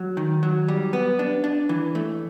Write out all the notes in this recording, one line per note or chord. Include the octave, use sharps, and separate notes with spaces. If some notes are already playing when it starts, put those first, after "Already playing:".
Already playing: F#3
D#3
F#3
G3
B3
D4
D4
E3
A3